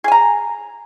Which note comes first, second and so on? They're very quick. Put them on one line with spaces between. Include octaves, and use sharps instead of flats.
G#4 G#5 A#5